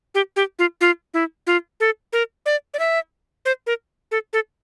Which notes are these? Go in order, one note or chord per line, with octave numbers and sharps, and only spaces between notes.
G4
G4
F4
F4
E4
F4
A4
A#4
D5
D5
E5
C5
A#4
A4
A4